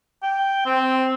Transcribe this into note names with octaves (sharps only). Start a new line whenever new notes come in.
G5
C4